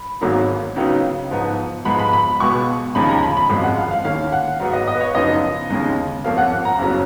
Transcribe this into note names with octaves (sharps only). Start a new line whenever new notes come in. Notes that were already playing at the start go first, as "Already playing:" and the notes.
Already playing: B5
G#1 G#2 F#3 A#3 D#4
C#2 C#3 F#3 B3 D#4
G#2 F3 B3 D#4
G#2 F3 G#3 B3 B5
B5
B5
C#2 B2 G#3 B3 C#6
D#2 C#3 F3 G#3 D#4 B5
A#5
B5
B5
G#1 F#2 F3 G#3
F#5
F5
F5
D#2 D#3 A#3 C#4 F5
F#5
G#2 F#3 B3 F5
D#5
D#5
B4
C#5
F#2 C#3 F3 B3 D#4 D#5
D#2 C#3 G#3 D#4
F2 F3 A#3 C#4 F5
F#5
F#5
A#5
F#1 F2 C#3 F#3